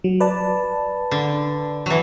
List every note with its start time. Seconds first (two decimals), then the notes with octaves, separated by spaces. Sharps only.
0.04 F#3
0.20 B4 D5 A5
1.11 D3
1.86 E3 F#3